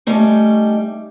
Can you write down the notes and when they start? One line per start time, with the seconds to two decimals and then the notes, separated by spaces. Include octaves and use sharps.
0.07 G3 A3 C#4 D#4